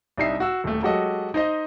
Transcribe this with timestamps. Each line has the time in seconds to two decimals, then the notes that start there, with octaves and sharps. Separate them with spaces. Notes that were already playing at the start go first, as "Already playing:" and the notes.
0.18 C2 G3 D4 D#4 E5 C7
0.40 F#4 E6
0.64 D#1 A3
0.83 F#3 G#3 F#4 G4 A4 D#5
1.34 D#4 C5 D#5